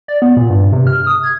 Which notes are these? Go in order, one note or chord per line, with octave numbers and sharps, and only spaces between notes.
D5
B3
A#2
G2
C3
F6
D#6
G#6